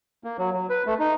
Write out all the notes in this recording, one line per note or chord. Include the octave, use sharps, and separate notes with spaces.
A#3
F#3
F#3
B4
A3
D#4